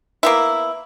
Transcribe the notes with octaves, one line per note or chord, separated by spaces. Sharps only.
A#3 B3 E4